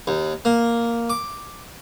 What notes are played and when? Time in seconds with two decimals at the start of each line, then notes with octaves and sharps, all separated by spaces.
0.07 D#2
0.45 A#3
1.10 D6